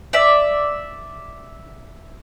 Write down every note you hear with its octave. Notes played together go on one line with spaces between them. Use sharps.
D5 E5